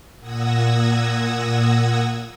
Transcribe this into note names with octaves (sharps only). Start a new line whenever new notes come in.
A#2 F#5 D#6 E6 G#6 A#6